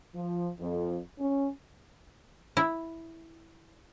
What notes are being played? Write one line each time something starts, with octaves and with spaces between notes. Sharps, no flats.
F3
F2
C#4
E4